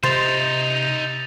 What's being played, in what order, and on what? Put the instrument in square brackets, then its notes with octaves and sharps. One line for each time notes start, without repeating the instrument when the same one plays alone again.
[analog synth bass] C3 [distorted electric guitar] D#4 E5 [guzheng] C5 [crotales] G6 A6 F7